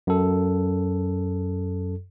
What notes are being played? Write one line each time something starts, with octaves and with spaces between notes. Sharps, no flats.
F#2 A4